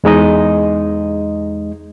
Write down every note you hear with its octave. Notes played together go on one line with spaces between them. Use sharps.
E2 G#3 D#4 D#5